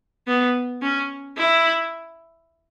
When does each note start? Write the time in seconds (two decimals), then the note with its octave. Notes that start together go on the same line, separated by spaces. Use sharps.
0.27 B3
0.81 C#4
1.37 E4